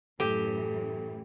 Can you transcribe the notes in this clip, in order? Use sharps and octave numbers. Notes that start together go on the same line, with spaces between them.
F#2 A2 E3 G4 A4